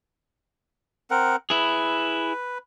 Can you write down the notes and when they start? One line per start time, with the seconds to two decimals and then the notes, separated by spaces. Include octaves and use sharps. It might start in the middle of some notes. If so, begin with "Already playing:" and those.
1.11 C4 A#4 F#5
1.50 E4 G#4 B4